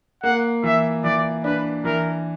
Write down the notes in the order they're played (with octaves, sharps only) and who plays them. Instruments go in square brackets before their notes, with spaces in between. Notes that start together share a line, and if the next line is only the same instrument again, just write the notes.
[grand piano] A#3 [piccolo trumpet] F#5
[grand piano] E3 [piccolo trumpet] E5
[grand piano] E3 [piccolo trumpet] D5
[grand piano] D4 [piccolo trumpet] B4
[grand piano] E3 [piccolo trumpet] A#4